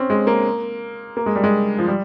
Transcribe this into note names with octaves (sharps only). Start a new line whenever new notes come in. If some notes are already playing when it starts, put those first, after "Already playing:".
Already playing: C4 C#4
G#3
A#3
A#3
G#3
G3
G#3
F3
G3